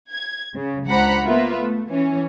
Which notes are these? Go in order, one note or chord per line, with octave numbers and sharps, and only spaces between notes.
G#6
C#3
C#2 D4 C5 F#5 A#5 B5
A#3 B3 F4 B4 E5
A3
E3 C#4